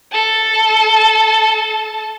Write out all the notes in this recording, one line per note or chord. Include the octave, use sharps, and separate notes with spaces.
A4 A5